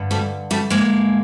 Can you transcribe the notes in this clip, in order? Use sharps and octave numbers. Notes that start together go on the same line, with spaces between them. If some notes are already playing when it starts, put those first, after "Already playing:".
Already playing: G2 D3
G3 A3
G3 A3
G#3 A#3